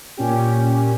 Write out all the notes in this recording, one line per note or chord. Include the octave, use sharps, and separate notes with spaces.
A#2 C#4 G4